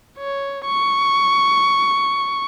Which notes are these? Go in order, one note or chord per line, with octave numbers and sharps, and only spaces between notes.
C#5
C#6